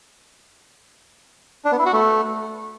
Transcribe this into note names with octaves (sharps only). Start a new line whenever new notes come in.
D4
B3
E4
F#4
A3